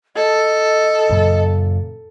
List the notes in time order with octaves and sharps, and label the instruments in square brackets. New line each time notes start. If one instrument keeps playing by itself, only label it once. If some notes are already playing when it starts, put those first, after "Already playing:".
[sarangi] A4 [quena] D#5
[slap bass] F#2 A#2 C#3